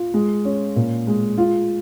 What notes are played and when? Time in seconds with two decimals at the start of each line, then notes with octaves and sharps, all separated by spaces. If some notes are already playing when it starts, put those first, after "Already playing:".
Already playing: F4
0.14 G#3
0.45 C#4
0.76 A#2
1.07 G#3
1.38 F4